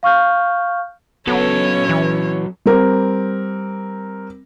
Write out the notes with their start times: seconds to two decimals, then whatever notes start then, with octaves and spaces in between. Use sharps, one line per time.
0.03 F5 C#6 F6 G6
1.27 F#3 B3 C#4 A4 C#5
1.89 E3
2.66 G3 C4 A#4